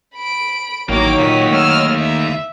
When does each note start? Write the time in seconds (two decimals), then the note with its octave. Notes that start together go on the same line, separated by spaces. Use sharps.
0.15 B5 D7
0.89 A1 D#3 F#3 A#3 A#4 C#5 G5 D6
1.20 D#2 A#2 D#5 B6
1.52 A3 E6 F6
1.96 E5